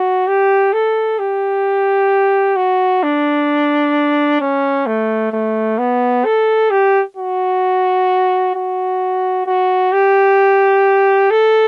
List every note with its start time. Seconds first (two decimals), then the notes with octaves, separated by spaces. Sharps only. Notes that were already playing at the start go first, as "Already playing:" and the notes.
Already playing: F#4
0.27 G4
0.73 A4
1.19 G4
2.56 F#4
3.03 D4
4.41 C#4
4.86 A3
5.32 A3
5.78 B3
6.25 A4
6.70 G4
7.17 F#4
8.55 F#4
9.46 F#4
9.92 G4
11.30 A4